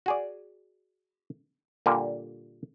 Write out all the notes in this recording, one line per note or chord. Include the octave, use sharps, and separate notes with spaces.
F#4 G#4 D5
A#2 D3 G3 A#3